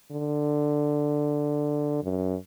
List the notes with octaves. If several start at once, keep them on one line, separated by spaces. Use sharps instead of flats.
D3
F#2